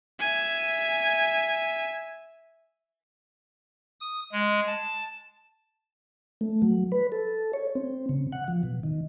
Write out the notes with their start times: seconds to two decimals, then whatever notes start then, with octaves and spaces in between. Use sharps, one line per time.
0.21 E5 G#5
4.01 D#6
4.32 G#3
4.67 A5
6.41 A3
6.62 F#3
6.92 B4
7.12 A4
7.53 C#5
7.75 C4
8.09 C#3
8.32 F#5
8.48 F3
8.63 B2
8.83 D#3